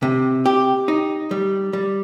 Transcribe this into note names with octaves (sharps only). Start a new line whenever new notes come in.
C3
G4
D#4
G3
G3